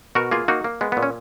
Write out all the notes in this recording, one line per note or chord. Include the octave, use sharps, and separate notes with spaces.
B2 F#4 A#4
A#3 F4 G#4
A#3 D#4 F#4
A#3
G#3 B3
A#2 B3
C#4